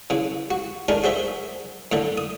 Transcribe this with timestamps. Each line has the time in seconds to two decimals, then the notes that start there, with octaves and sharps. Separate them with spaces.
0.10 C#3 E3
0.51 F#4
0.88 A3 D4 D#4 G#4 A#4
1.04 F#4 G#4 C5 E5
1.92 A2 D3 A3
2.18 D#6